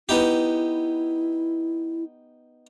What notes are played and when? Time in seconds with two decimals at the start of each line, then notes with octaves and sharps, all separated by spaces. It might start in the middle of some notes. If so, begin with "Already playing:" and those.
0.09 B3 D#4 E4 G4